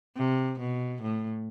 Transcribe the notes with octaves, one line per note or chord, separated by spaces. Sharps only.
C3
B2
A2